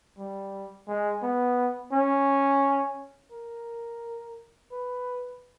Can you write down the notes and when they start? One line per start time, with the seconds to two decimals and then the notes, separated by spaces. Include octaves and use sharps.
0.18 G3
0.88 G#3
1.23 B3
1.92 C#4
3.32 A#4
4.72 B4